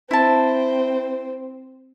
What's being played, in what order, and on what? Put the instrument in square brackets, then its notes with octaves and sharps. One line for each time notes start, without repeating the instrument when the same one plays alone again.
[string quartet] C4 [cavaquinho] E4 A5